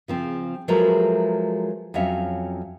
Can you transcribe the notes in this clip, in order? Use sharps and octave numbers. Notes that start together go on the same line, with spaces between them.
C#3 F3 C4
F3 F#3 G#3 A3 A#4 B4
F2 F#3 C#4 E5 F5